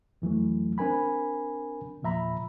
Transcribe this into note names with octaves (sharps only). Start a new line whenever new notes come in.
F2 E3 F#3 A3
C4 D4 A#4 G#5 B5
E2 A#2 F3 E5 A#5 B5